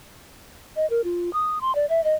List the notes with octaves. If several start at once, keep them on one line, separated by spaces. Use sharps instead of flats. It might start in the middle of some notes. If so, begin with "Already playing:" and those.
D#5
A#4
F4
D#6
C6
D5
E5
D#5